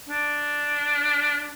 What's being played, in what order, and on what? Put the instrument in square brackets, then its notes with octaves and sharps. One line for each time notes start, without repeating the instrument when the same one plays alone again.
[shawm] D4